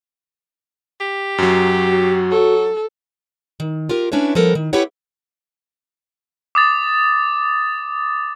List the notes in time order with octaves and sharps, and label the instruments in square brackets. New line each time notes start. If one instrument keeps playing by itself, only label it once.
[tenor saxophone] G4
[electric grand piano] F#2 F#3 [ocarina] F#4
[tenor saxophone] F#3 [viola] A4
[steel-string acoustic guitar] D#3
F4 G4 A#4
C#4 D4 E4 B4 C#5
F3 G3 B3 A4 A#4
D#3
E4 G4 A4 B4 C#5 F#5
[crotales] D6 D#6 A6